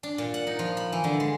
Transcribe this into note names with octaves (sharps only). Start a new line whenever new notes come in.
D4
A#2
F#5
D#4
F3
B5
E3
D3
G#3